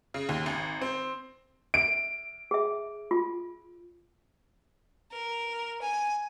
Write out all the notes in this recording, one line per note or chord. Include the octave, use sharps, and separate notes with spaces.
C#3
D#2
G#1
C4
E5 D7
G#4 E5
F4
A#4
G#5